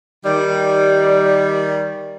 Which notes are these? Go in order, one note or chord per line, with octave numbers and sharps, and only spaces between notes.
D#3 G3